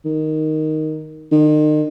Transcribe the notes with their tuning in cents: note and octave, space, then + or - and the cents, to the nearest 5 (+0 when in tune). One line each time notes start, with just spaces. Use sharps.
D#3 +0
D#3 -35